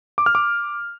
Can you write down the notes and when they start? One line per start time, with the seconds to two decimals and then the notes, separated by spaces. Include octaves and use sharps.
0.18 D6
0.26 F6
0.35 D6